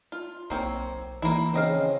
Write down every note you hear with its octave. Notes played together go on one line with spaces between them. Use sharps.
F4
B1 A#3 C4 C#5
E3 A#3 E4
C#3 C4 D#5 F5